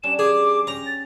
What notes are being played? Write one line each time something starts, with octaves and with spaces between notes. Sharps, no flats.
G3 C#4 D4 E7
G#4 D6
C#4 G4 A#5
A6